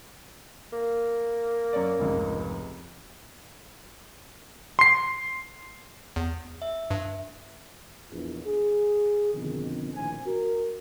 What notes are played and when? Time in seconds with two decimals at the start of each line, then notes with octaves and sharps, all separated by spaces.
0.72 A#3
1.73 F#2 C#5 D5
1.99 F1 C#2 G#2
4.79 C6 C7
6.16 E2
6.62 E5
6.91 G2
8.11 A#1 E2
8.46 G#4
9.34 F2 B2 D3 D#3
9.93 A#1 A2 D#3 C4 G#5
10.27 F#4 A#4